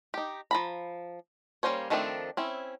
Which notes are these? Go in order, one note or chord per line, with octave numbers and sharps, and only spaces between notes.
D#4 G4
F3 A#5 B5
G3 A#3 C#4 C5 C#5
D#3 F3 A3 C4 D4
C4 C#4 E4